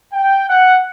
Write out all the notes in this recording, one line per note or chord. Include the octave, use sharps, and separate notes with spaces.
G5
F#5